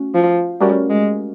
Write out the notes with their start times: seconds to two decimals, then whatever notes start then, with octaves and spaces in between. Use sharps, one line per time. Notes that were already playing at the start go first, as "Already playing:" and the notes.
Already playing: A3 C#4 F#4
0.14 F3
0.60 G3 A3 C#4 F#4 A#4
0.90 G#3